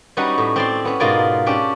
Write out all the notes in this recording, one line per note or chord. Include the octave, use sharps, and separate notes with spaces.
G3 C#4 D#4 F#4 B4 F#5
A2
C4 D5 C6
B3 C#4
G#2 B2 F4 A#4 D5 G#5
C#4 D4 G4 G5